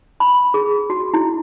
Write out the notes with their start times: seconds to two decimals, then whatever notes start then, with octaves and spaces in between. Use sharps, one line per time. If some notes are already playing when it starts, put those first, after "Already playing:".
0.20 B5
0.54 G#4
0.90 F#4
1.14 E4